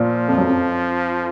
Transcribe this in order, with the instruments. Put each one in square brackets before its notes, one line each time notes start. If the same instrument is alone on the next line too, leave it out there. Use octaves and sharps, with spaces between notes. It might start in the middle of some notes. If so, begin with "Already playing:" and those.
Already playing: [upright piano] A#2 [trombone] F3
[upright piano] F2
F#2
F2